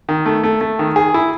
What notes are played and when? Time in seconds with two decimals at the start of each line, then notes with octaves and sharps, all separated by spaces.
0.09 D#3
0.26 A3
0.43 A3
0.61 A3
0.79 D#3
0.96 G#4
1.14 E4